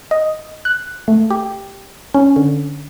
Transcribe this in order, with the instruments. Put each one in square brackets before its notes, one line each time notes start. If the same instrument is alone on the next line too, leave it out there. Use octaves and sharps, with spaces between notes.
[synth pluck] D#5
F#6
A3
G4
C#4
D3